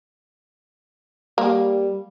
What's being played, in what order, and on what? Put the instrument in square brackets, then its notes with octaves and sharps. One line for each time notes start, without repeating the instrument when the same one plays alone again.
[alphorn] G3 [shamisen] A#3